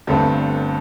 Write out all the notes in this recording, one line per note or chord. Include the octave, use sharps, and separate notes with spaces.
G1 G2 D3 A3 C4